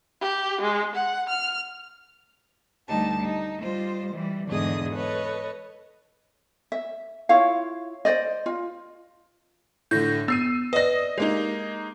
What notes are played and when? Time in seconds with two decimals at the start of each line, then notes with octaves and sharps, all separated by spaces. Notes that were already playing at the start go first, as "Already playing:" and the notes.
0.21 G4
0.61 G#3
0.95 F#5
1.29 F6
2.88 D2 G3 D#4 G4 A5
3.22 D#4
3.61 G3 F4 C5 D#5
4.14 E3 G3
4.47 E2 G#2 D3 G#4 D#5 D#6
4.95 A4 B4 C#5 D#5
6.72 E5
7.29 E4 F4 C#5 F5
8.05 C5 D5 D#5
8.46 F4
9.91 A2 D3 G6 A#6
10.28 B3 E6 C7 D#7
10.73 B4 D5 D#5 A#6
11.18 G#3 A#3 D#4 G4